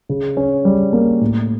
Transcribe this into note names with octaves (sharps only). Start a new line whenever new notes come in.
C#3
C#4
G3
A#3
A2